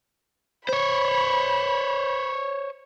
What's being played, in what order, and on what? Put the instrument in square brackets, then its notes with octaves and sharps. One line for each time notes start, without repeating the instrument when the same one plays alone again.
[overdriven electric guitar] C5 C#5 [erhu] B5